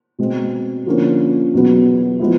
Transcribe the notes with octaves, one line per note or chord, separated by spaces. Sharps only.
B2 G#3 C4
D3 F3 A#3 C#4
E2 B2 F#3 B3
F3 G#3 B3 E4